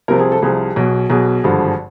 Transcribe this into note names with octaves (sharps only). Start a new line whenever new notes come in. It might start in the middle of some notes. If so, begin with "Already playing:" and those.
C2 C3 F3 A#4
G#4
A4
C2 C3 F3 G#4
B1 B2
B1 B2 G#4
G#1 G2 D3 F3